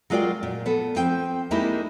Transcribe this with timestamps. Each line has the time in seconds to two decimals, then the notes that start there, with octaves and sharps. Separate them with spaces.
0.10 F#3 G#3 F4 A#4 D5 G5
0.43 A#2
0.66 B3 A4
0.96 F3 C4 G5
1.51 G3 G#3 A#3 D#4 E4 G4